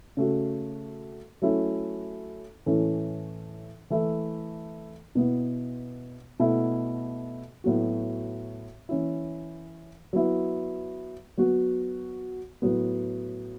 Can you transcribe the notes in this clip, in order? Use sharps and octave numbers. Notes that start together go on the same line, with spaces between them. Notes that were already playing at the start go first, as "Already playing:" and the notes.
C#3 A3 F#4
F#3 A3 C#4 E4
A2 E3 A3 C#4
E3 A3 E4
B2 B3 E4
B2 A3 E4
A2 F#3 B3 F#4
E3 C#4 E4
F#3 B3 E4
F#3 B3 F#4
A2 F#3 B3